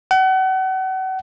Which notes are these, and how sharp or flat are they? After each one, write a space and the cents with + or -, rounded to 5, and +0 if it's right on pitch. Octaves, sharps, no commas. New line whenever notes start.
F#5 +35